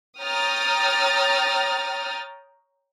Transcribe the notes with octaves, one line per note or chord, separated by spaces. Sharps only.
C#5 G5 A#5 D#6 F6 A6